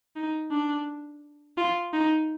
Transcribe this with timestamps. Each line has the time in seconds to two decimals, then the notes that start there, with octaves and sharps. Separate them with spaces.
0.16 D#4
0.51 D4
1.57 F4
1.93 D#4